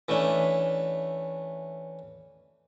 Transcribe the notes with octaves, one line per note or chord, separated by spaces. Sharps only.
E3 A3 C#4 D4